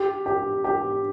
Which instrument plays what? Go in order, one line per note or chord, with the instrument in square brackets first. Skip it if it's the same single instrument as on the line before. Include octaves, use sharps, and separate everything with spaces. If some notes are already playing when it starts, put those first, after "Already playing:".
Already playing: [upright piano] G4
G4
G4